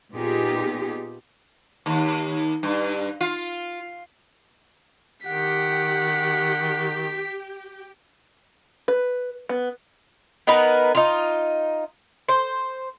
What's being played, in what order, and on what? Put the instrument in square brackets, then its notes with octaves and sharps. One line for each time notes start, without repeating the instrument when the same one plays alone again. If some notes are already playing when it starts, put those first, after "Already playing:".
[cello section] A#2 B3 D#4 F4 G4 G#4
[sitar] D#2
G2
F4
[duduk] D#3 [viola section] G4 [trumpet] F#5 [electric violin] B6
[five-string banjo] B4
B3
[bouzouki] B3 D#4 A#4 B4
D#4 F4
C5